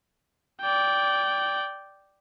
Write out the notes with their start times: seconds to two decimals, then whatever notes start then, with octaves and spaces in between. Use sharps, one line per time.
0.61 D5 G5